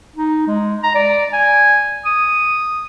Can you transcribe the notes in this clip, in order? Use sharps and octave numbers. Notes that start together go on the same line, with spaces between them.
D#4
G#3
A#5
D5
G#5
D#6